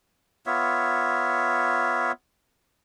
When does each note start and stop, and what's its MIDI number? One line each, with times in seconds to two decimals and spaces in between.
0.46 2.12 59
0.46 2.12 65
0.46 2.12 73
0.46 2.12 76